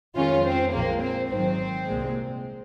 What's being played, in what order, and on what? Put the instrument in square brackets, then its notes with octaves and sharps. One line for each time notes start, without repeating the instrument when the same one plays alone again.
[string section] F2 D#3 G#3 C#4 F4
C4
A#1 A#2 F3 G#3 A#3
C4
G#1 G#2 D#3 F#3 C4
C2 A#2 G#3